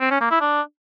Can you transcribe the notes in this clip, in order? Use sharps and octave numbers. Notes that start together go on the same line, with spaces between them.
C4
C#4
A#3
E4
D4